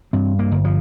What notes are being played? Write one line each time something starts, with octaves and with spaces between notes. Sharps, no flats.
G2 C4
A#3
G1
F3